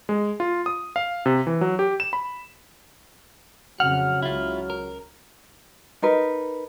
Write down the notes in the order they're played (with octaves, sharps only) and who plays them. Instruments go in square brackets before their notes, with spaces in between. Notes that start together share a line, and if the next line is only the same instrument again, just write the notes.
[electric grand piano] G#3
F4
D#6
F5
C3
E3
F#3
G4
E7
B5
[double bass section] F2 C#3 [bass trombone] F#3 [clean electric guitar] F#5 [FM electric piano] F6
[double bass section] C#2 [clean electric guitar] E4 F4
[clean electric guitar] A#4
[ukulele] D#4 A#4 B4